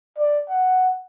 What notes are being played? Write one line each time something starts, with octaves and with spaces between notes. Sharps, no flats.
D5
F#5